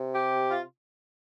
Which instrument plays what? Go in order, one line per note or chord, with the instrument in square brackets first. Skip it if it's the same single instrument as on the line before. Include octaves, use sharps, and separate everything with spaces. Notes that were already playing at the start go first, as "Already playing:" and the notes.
Already playing: [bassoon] C3
[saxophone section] G4
F4